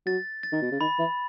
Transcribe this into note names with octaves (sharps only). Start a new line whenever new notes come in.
F#3 A6
A6
D#3
B2
C#3
D#3 B5
E3